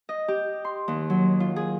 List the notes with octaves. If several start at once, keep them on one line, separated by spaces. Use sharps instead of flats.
D#5
G4
C6
D#2
F#3
F4
G#4